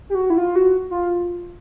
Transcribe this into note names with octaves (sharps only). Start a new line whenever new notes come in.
G4
F#4
E4
F4
F#4
F4